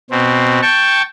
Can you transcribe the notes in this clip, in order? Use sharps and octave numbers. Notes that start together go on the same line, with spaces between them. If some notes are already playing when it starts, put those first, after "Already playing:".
B2 C4
G5 A5 C#6